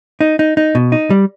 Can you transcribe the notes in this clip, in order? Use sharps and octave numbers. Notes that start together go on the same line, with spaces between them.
D#4
D#4
D#4
B2
D#4
G3